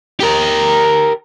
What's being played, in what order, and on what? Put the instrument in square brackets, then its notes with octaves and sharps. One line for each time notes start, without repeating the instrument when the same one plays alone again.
[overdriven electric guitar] G4 A#4